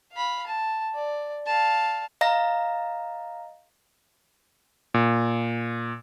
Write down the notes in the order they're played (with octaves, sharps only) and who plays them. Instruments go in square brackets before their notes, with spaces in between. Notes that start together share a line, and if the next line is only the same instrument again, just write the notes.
[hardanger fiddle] F5 B5
A5
D5
F5 A5
[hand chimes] D#5 F5 A#5 A#6
[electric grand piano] A#2